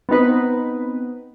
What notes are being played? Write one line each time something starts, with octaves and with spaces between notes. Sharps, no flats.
B3 C4 D#4 B4